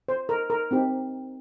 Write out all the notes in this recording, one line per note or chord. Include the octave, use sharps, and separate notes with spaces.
C5
A#4
A#4
C4 D#4 G4